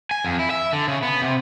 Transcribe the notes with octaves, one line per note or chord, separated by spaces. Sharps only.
G#5
F2
E4
E5
D3
C#3
B3
C3